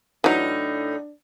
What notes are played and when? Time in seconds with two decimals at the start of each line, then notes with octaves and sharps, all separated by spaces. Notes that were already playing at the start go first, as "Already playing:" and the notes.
0.24 A2 E3 F#3 D4 D#4